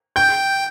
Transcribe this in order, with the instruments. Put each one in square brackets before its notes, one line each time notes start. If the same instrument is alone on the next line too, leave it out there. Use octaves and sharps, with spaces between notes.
[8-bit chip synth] G5 [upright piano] G6